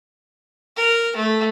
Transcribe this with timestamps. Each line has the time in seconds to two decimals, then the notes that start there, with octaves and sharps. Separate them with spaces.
0.76 A#4
1.16 A3